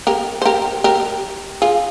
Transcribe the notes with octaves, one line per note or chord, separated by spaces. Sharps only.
G4 A#4
C5
G4 A#4
G4 A#4
F4 G#4